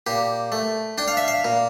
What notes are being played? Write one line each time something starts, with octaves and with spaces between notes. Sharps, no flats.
A#2 G4
A3
D4 G5
F5
E5
F5
A#2